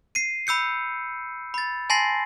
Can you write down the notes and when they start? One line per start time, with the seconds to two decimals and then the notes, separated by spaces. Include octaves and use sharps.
0.15 C7 D#7
0.47 B5 E6 G6 C#7
1.54 B5 A6
1.90 G#5 A5 C6 A6 A#6 C7